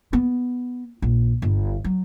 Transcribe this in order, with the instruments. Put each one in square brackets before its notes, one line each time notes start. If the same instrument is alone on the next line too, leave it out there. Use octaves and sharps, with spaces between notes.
[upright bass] B3
A#1
G1
F#3